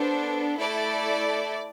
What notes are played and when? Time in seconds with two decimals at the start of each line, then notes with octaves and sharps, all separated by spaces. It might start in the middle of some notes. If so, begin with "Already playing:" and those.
Already playing: B3 D4 A4 C5
0.59 A3 E4 A4 D5